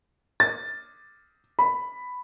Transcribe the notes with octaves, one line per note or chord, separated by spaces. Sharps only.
A6
B5